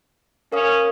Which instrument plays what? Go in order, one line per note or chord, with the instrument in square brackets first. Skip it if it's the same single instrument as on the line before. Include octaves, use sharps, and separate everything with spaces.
[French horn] C#4 [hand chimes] A#4 F5 D#6